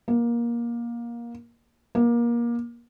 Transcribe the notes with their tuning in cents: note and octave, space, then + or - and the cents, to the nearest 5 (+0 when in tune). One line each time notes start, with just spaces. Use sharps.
A#3 +20
A#3 +25